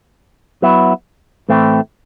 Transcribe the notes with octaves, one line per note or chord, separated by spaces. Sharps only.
F#3 B3 E4
A2 E3 A3 C4